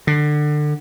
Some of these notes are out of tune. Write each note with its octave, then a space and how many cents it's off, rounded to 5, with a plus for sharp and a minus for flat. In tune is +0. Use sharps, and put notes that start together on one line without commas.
D3 +25